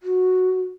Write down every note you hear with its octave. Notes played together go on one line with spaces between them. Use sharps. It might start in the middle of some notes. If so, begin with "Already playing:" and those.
F#4